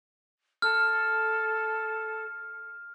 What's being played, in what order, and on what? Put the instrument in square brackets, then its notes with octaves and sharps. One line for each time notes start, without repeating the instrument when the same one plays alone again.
[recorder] A4 [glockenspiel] F6